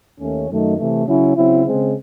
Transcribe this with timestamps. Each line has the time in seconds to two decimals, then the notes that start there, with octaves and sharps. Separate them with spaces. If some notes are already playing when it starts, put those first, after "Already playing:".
0.20 D#2 D#3 A3 C#4
0.49 F#2 D#3 F#3 A3 D#4
0.78 C3 E3 A3
1.07 C#3 F#3 C#4 E4
1.36 C#3 F#3 C4 E4
1.65 C#3 G#3 C4